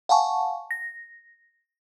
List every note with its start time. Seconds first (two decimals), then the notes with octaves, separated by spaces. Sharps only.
0.09 F5 F#5 G#5 A5 C#6
0.71 A#6